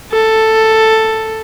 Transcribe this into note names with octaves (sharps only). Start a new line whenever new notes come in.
A4